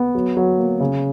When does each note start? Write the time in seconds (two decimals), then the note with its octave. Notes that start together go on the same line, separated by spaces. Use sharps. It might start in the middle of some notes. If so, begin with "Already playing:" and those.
Already playing: B3
0.15 F#3
0.37 F#3
0.58 A#3
0.80 C#3